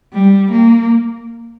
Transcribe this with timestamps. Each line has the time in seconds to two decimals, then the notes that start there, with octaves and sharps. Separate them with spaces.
0.13 G3
0.51 A#3